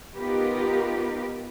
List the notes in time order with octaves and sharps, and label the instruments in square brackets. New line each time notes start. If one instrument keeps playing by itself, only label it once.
[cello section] B3 D#4 F4 G4 A#4 B4